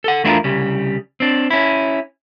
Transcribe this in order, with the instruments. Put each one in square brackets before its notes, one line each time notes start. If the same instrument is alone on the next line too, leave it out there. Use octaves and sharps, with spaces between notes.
[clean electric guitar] A4 F#5
E2 A3 D4 E4 F4 A#4
C2 C#3 G3
C4 D4
C#4 E4